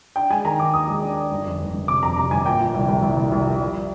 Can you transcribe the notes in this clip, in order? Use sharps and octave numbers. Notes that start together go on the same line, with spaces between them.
D4 G5
G#3 G#5
D#3 A#5
D#3 D6
D#2 D#6
G#3
D4
D4
G1
F2
G1
G1
C3 D6
F2 A#5
C3 A#5
G1 G#5
A#2 G5
F3
C2
C2
C2
C2
C2
F3
G3